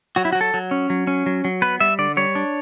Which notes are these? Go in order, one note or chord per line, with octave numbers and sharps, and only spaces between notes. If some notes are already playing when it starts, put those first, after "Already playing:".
F#3 F#4
E4
F#4
F#3
A4
F#3
C#4
F#3
C#4
F#3
F#3
B3 B4
G3 E5
D3 D5
G3 C#5
D4